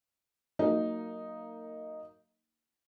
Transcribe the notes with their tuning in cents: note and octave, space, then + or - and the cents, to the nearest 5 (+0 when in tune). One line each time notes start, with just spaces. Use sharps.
F#3 +0 A#3 -20 D#4 +0